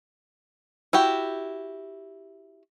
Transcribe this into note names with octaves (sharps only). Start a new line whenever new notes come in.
E4 F#4 G4